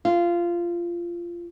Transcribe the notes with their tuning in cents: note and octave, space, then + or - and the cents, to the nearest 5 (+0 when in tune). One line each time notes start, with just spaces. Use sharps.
F4 -15